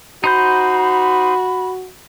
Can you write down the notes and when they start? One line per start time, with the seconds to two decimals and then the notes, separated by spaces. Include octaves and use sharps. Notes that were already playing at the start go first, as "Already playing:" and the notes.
0.24 D#4 F#4 C5 B5 G6